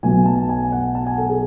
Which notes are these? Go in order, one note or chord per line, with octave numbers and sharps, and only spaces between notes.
B1 B2 F#3 A3 G#5
A5
G#5
F#5
A5
G#5
A4
G#4